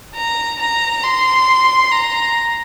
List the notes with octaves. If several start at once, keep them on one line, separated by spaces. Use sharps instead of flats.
A#5
A#5
C6
A#5